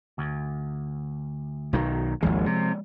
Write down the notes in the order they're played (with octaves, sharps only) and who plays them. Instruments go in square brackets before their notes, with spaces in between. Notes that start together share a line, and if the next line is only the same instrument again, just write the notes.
[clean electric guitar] D2
[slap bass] B1 D#3 F#3
[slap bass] G#1 D#2 [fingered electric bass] F3 G#3
[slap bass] C3